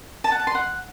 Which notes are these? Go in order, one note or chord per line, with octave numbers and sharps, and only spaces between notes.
A5
F#5
A5
C6
F#5